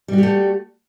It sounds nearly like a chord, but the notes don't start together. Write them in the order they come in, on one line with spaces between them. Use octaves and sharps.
G3 F#4 G4 A3